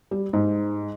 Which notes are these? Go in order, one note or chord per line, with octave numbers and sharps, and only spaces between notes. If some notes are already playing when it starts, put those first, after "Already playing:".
G3
G#2